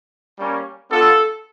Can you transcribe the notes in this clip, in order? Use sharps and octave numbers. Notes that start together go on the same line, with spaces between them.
G3 A#3 C#4
B3 D4 F4 A4